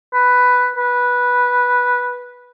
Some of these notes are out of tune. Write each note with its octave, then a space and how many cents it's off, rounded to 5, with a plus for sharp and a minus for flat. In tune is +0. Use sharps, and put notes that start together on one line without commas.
B4 +5
B4 -10